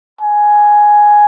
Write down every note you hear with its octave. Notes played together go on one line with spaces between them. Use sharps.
G#5